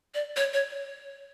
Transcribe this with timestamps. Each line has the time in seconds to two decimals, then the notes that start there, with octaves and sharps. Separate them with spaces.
0.14 D5
0.36 C#5
0.53 C#5